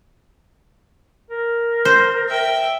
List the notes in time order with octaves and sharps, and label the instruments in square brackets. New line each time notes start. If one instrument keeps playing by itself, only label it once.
[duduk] A#4
[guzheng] C5
[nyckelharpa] E5 G5